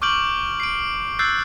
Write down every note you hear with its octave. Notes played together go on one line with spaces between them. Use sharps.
C#6 D6 F6 G6 D7 F#7
C7 D7
E6 F#6 G6 A6 C7